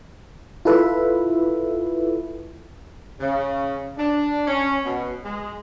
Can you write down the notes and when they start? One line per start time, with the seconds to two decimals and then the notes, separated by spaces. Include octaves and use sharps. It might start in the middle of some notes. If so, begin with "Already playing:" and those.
0.65 E4 F4 A4 B4 E5
3.19 C#3
3.98 D4
4.48 C#4
4.85 B2
5.25 G#3